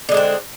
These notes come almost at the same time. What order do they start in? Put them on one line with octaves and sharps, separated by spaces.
D3 G#3 D4 C4